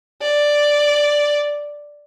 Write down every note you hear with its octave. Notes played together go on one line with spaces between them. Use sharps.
D5